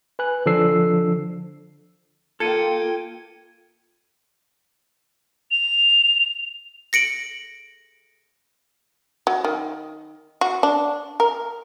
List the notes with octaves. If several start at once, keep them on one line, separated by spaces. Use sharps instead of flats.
B4 G#5 F#6
D3 F3 D4 A4 E6 C7
A#3 F4 A4 G5 G#6 C#7 D#7
F7
A#6 C#7 D7 F#7
F#3
D#3
F#4
D4
A#4